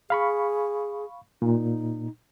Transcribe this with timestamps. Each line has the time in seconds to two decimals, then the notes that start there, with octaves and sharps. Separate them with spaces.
0.10 G#4 F5 B5 C#6
1.42 A#2 D#4